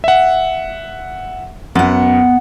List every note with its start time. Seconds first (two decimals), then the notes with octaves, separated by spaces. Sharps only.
0.04 E5 F#5
1.75 F#2 B3 F#5